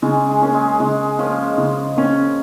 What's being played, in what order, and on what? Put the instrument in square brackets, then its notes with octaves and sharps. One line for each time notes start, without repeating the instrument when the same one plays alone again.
[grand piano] C#3 [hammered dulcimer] G#3
[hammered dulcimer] G#3
[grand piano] A#3 C#4
[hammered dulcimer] G#3
[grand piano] C#3 [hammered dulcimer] G#3
[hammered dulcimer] F3 [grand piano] A#3 C#4
[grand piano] C#3
A#3 C#4